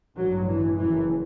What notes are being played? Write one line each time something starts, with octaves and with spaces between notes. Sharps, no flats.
A1 G2 F#3
E3
F#1 F#2 E3